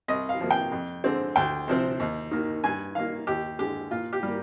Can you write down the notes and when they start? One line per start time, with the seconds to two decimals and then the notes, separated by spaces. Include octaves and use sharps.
0.08 C2 D#5
0.29 F5
0.40 C3 F3 A#3
0.51 G5
0.72 F2
1.04 D3 G#3 C4
1.36 D2 G5
1.68 C3 F3 C4
2.00 D#2
2.31 D#3 A#3
2.64 G2 G#5
2.95 D#3 A#3 F5
3.27 D#2 G4
3.59 D3 G#3 G4
3.91 A#2 F4
4.13 G4
4.23 G3 A#3